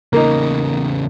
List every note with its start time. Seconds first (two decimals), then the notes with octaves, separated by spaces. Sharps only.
0.13 E2 C#3 A#3 D#4